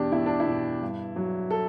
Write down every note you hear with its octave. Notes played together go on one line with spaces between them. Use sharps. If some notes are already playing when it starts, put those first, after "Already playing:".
Already playing: E2 B2 D4 G4
B2 E4
D4
E4
B2
G2
F#3
A4